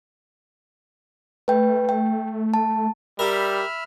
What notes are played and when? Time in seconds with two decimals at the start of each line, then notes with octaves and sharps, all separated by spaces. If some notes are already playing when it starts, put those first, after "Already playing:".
1.48 A3 B4 G5
1.89 G5
2.54 A5
3.19 G3 G4 A#4 E5 B5 F6